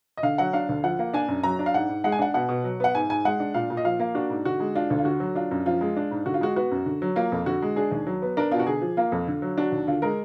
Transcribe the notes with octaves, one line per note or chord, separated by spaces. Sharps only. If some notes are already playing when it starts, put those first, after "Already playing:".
D#5
D3 F5
F#3 F#5
D4 F5
D2
F3 F#5
A#3
D4 G#5
F#2
F#3 A#5
D4
F5
G#2 F#5
G#2
G#3 F#5
G#5
D4 F#5
B2 F#5
B2
F#3
B3 F#5
G#2 G#5
G#2 G#5
G#3 F#5
D4
A#2 F5
A#2
D#5
F3 F5
A#3
D4 F#4
G#2
D3 F#4
G#3
D4 F4
D2
F4
D3 F#4
F#3
D4 F4
F#2
F3 F4
G#3
D4
G#2
D3 F#4
F4
G#3 F#4
B3 F#4
F#2
D3
F#3
A#3 F4
F2
D3 F#4
G#3
D4 G#4
D#2
F#3
B3
D4 A#4
B2 F4
F#4
D3 G#4
F3
A#3 F4
F2
D3
F#3
D4 F#4
D#2
D3 F4
G#3 A#4